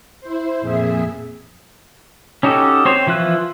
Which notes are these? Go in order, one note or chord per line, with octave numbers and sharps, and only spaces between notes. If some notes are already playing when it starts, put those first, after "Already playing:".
E4 C5
F2 A#2 G#4 E5
C#4 D#4 F#4 G4 A4
C4 C5 C#5
E3 F3 E4 F4 F#6